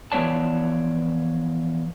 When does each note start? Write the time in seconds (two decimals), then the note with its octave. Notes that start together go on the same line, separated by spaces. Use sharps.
0.12 E3 F3 B3 C#5 D5 A5